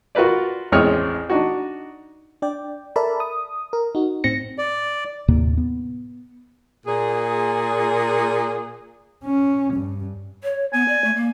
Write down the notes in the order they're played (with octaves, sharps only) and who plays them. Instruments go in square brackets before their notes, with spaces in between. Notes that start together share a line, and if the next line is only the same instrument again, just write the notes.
[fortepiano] F4 F#4 A#4 B4 D5
A1 E2 G#3 C4 C#5 F6
D4 D#4 F#4
[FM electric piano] D4 D5 G5
A4 A#4 D5 E5 A5 B5
D#6
A#4
D#4 F#4
A2 C4 A#6 C#7
[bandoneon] D5
[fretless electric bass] D#2 A2 C3 A#3
B3
[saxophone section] A#2 G#4
[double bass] C#4
G2
[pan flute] C#5
[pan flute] B3 [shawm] G#5
[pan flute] D5
A3
A#3